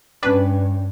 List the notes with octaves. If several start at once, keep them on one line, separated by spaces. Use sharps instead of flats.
G2 C#4 D4 B4 G5